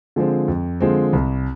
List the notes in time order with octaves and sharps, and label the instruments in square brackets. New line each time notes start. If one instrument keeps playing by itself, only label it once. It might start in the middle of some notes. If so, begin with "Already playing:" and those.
[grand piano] D3 F3 G#3 C4
F2
D3 F3 G#3 C4
C2